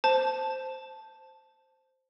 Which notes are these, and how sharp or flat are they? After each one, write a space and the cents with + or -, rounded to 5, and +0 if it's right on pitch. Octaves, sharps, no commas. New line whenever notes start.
C5 +0 A5 +0